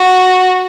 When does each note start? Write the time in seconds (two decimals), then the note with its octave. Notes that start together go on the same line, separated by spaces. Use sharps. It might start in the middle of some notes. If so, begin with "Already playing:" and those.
Already playing: F#4